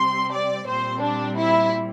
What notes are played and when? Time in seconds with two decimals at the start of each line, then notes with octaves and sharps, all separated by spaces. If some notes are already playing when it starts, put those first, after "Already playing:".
Already playing: C3 G3 C4 C6
0.32 D5
0.67 A#2 G3 C4 C5
1.02 D4
1.37 E4